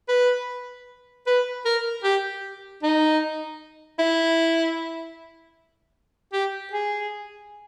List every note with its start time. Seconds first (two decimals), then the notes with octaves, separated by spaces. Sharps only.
0.09 B4
1.27 B4
1.65 A#4
2.04 G4
2.83 D#4
3.99 E4
6.33 G4
6.73 G#4